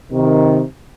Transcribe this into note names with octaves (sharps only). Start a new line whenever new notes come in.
C3 D#3